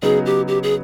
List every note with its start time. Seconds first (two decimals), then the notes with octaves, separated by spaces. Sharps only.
0.02 C#3 F#3 B3 D#4 G#4
0.26 G4
0.48 G4
0.63 G#4